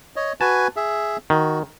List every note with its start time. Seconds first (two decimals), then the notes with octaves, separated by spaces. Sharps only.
0.16 C#5 D#5
0.41 F#4 B4 G#5 A5
0.76 G#4 E5
1.30 D#3 F#4